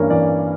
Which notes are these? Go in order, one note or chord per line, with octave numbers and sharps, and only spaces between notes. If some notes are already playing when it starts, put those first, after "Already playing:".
Already playing: G2 E3 A#3 C#4 A#4
E3 D5